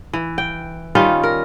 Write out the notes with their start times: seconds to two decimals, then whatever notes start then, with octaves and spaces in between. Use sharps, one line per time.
0.13 E3
0.38 G5
0.95 D#3 G3 C#4 F4
1.23 A#4